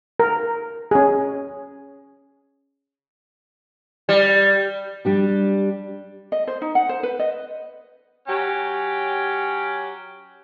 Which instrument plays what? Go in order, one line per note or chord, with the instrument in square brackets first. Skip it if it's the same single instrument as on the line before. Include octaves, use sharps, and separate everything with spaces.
[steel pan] A#4
C#4 G#4
[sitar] G3
[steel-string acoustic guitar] G3 D4 G4
[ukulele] D#5
C5
D#4
F#5
C5
B4
D#5
[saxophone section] F#3 C#4 G4